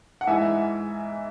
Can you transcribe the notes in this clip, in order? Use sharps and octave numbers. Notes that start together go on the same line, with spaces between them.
F#5
G#2 E3 E5 G#5